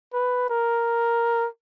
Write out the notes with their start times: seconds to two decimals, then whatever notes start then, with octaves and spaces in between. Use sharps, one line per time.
0.13 B4
0.50 A#4